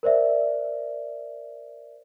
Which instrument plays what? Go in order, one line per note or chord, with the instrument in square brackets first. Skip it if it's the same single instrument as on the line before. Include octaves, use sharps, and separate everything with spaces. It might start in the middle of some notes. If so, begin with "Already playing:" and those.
[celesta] A#4 C5 D5 E5